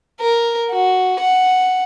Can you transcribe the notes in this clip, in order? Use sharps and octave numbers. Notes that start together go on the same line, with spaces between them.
A#4
F#4
F#5